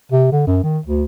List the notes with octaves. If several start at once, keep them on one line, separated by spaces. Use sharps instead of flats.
C3
D3
F#2
D#3
D2